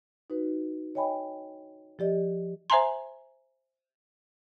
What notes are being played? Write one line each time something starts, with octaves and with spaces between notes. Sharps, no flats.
D#4 F#4 B4
C#5 D#5 G5 G#5 B5
F3 G4 D5 D#5
C5 E5 G#5 A#5 C6